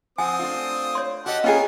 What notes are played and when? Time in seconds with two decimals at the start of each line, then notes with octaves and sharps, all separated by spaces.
0.18 F3 C4 F#5 G#5 D#6
0.39 A3 D4 F4
0.95 C#5 C6
1.26 F#4 G4 A4 D#5 F#5
1.44 B3 C#4 F4 G#4 A#4 F5 G5